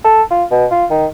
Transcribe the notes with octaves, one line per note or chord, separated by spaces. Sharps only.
A4
F4
B2
F4
D#3